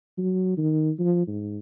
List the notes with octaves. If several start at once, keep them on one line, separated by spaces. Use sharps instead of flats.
F#3
D#3
F3
G#2